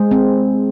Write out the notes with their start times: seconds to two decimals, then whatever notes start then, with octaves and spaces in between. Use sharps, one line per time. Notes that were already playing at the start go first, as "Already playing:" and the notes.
Already playing: G#3 G#4 C5
0.11 C4